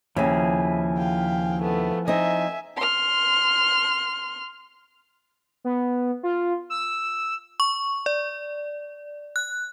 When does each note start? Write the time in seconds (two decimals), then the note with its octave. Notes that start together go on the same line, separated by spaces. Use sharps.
0.17 D#2 C#3 F3 E4 G#4
0.98 F5 G5
1.62 A3 B3
2.08 C4 D#4 D#5 E5 G#5
2.77 C6 F6
5.64 B3
6.23 F4
6.70 E6
7.60 C#6
8.06 D5
9.36 F#6